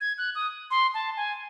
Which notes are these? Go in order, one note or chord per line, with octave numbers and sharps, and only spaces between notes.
G#6
F#6
D#6
C6
A5
G#5